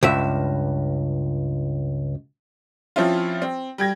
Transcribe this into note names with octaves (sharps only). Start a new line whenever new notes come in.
C#2 G2 E5
F3 C4 C#4 E4 F4
C4
G3 G5 G#6 A#6